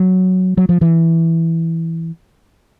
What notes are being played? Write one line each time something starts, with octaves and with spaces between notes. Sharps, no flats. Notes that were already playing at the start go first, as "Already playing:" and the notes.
Already playing: F#3
F#3
F3
E3